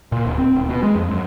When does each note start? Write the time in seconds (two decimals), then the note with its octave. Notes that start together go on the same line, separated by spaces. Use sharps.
0.12 A#2
0.25 D1
0.38 C4
0.56 D#1
0.69 B2
0.83 G#3
0.95 F2
1.11 F#2